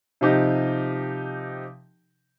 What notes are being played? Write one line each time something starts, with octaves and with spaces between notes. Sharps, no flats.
C3 F3 D#4 G4